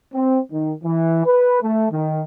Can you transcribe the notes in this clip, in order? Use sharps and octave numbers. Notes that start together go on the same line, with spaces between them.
C4
D#3
E3
B4
A3
D#3